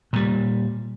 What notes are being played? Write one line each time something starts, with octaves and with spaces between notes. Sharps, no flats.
A#2 G3